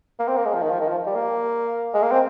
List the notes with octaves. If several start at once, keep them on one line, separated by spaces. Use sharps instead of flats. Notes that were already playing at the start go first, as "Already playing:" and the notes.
A#3
C4
A#3
G#3
F3
D#3
F3
D#3
F3
G3
A#3
G#3
A#3
C4